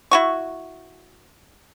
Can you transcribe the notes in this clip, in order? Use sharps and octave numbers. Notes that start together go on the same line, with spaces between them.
E4 F#4 C#6